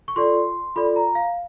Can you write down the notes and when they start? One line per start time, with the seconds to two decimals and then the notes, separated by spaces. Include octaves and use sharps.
0.08 C#6
0.16 F4 A4 D5 C6
0.76 F4 A4 D5 B5
0.96 A#5
1.15 F5